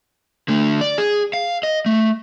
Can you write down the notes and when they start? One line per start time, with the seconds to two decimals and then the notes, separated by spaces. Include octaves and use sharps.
0.48 D3 A3
0.81 D5
0.98 G#4
1.33 F5
1.63 D#5
1.86 A3